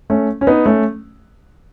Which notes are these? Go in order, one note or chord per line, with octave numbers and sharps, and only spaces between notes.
A3 C#4
C#4
B3 D#4
A3 C#4